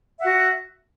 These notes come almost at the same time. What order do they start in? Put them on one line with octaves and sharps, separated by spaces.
E5 F#5 F#4